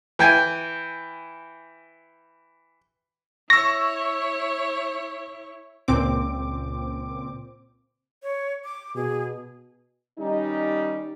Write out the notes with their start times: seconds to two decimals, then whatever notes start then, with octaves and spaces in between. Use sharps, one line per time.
0.19 E3 G5 G#5
3.50 E4 C#5 C#6 E6 A#6
5.88 C#2 A#2 C4 D6
8.23 C#5
8.64 D6
8.96 B2 G#4
10.19 D#3 G3 C#4 D#4